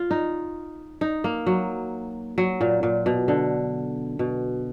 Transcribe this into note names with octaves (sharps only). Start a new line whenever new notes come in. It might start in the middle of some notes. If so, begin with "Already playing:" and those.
Already playing: F4
D#4
D#4
A#3
F#3
F#3
A#2
A#2
B2
D3
B2